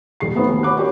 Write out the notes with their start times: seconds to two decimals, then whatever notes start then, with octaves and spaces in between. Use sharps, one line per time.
0.20 D#1 C7
0.35 A3 B3 C4 D#4
0.48 D#2
0.63 C#5 F#5 B5 D6 F#6
0.77 C#4 D4 F#4 G4 A#4 C#5